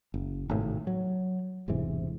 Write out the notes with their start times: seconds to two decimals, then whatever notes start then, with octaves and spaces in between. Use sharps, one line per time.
0.14 F#1
0.49 G#1 A2 C3
0.87 F#3
1.68 E1 G#2 C3 E3